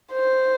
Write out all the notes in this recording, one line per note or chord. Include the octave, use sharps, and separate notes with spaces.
C5